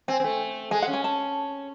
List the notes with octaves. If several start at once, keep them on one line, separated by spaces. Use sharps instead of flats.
C4 G#5
C4
A3
G#3 G#5
F#5
C#4
G#5
A5